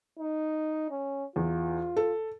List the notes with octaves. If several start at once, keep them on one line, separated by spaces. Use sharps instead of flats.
D#4
C#4
E2 F4
A4